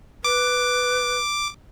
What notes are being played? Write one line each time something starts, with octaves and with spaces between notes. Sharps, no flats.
B4 D6